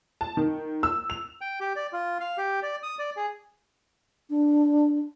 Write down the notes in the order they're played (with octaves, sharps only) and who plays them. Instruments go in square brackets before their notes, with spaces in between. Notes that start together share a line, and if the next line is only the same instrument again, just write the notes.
[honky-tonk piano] A5
D#3
E6
F7
[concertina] G5
G4
D5
F4
F5
G4
D5
D#6
D5
G#4
[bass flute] D4